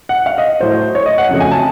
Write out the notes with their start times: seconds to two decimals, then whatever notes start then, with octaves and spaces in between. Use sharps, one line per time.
0.09 F#5
0.26 F5
0.38 D#5
0.60 A2 F#3 A3 C5
0.95 C#5
1.06 D#5
1.18 F#5
1.29 F2 C#3 F#3 A3
1.40 G#5
1.51 A5